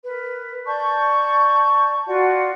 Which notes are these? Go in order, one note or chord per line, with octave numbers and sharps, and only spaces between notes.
A#4 B4
D5 A5 C#6 G6
F4 F#4 D5 F#5